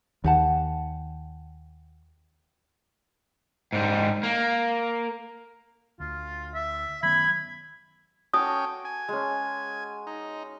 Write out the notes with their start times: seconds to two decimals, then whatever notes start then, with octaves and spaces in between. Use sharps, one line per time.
0.24 D#2 G4 F#5 A5
3.72 G#2 G3
4.23 A#3
6.00 D2 F4
6.54 E5
7.03 D#3 F#3 B3 B5 G#6
8.34 C#4 F#4 A4 G5 D6 D#6
8.85 G#5
9.09 G#3 C#4
10.07 D#4